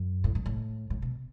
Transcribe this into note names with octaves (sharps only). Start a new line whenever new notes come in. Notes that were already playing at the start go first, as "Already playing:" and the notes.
Already playing: F#2
A2
A2
A2
A2
B2